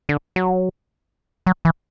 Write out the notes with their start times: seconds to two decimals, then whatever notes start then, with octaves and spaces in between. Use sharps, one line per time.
0.09 D3
0.36 F#3
1.46 F#3
1.65 E3